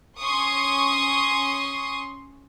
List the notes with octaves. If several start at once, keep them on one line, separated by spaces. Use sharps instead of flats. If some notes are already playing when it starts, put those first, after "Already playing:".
C#4 C6 C#6 D#6